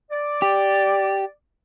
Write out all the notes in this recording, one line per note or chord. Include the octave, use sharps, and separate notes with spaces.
D5
G4